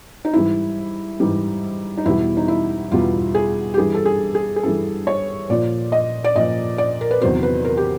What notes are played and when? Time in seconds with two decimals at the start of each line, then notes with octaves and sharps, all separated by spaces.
0.25 D#4
0.34 G#2 E3 G3 E4
1.20 G#2 E3 G3
1.97 D#4
2.05 E2 B2 G3 E4
2.37 D#4
2.48 E4
2.92 E2 B2 G3 F4
3.35 G#4
3.74 G4
3.77 G2 E3 G3 G#4
3.94 A4
4.06 G#4
4.35 G#4
4.56 G#4
4.63 G2 E3 G3 A4
5.07 C#5
5.49 A#2 F3 D5
5.92 D#5
6.24 D5
6.36 A#2 F3 D#5
6.78 D5
7.01 A#4
7.11 B4
7.21 E2 C3 D#3 F#3 C5
7.43 B4
7.65 A#4
7.77 G4